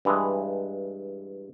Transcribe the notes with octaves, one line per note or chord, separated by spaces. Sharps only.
G2 E3 G#3